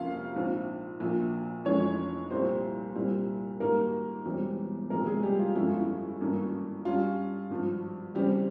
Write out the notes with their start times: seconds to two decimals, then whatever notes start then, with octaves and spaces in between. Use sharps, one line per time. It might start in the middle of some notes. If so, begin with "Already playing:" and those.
Already playing: F2 C3 A#3 C#4 F4 F5
0.36 A#1 G#2 F3 C4
1.00 A#1 A#2 F3
1.65 F1 F2 E3 G#3 C#4 C#5
2.30 C2 A#2 G3 C4 C5
2.95 C2 A#2 G3 C4
3.60 G#1 G#2 G3 A#3 A#4
4.25 E1 E2 E3 G3 C4
4.90 E1 E2 C3 F3 A#3 A#4
5.07 G#3 G#4
5.23 G3 G4
5.39 F4
5.55 G1 F2 E3 G#3 C#4 E4
5.67 F4
5.80 E4
6.20 G#1 G2 E3 A#3 C#4
6.85 G2 G3 C#4 F4
7.50 G#1 G2 F3
8.15 E2 C#3 G3 C4 G4